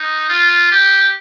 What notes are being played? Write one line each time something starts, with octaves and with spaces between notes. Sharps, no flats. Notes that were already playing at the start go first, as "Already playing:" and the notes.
Already playing: D#4
F4
G4